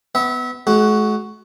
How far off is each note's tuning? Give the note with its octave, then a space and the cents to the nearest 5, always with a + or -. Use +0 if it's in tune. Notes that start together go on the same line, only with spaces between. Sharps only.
B3 +10 E5 -30
G#3 +45 F#4 +5